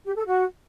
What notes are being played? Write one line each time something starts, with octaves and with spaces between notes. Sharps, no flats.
G4
A4
F#4